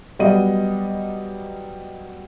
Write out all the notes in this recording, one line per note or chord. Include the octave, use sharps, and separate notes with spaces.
F#3 G3 B3 D5 D#5 D#7